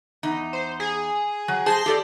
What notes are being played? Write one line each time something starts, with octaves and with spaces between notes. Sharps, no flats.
E2 D#4
C5
G#4
F#3
G#4 C5 A5 C6 A#6 C7
G4 A4 D5